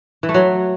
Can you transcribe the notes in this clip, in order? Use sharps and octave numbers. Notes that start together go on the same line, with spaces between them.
E3
A3
F#3